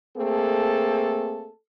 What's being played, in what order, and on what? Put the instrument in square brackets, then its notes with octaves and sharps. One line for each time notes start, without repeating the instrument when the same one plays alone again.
[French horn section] A3 A#3 C4 G#4 A4